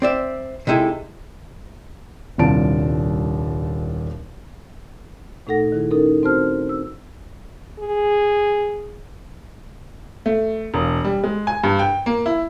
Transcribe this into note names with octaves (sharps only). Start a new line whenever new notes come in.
C4 D5 E5
C3 G#3 D#4 E4 A4
D#1 C2 D4 F4 A5 D7
A#2 A3 D#4 A4 F#5 A#6
D#3 E4 G#4
C#4 D#4 A4 A#4
C4 F#4 C5 A5 F6
E6
G#4
A3
E1
G3
G#3
G#5
G2
G5
A#3
E4